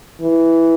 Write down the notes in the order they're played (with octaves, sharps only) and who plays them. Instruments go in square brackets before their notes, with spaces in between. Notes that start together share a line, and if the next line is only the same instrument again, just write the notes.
[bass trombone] E3